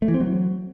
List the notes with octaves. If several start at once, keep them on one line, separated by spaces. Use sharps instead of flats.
A3
E3
C4
F#3